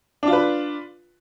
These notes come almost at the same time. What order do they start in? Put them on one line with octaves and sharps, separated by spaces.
D4 F4 B4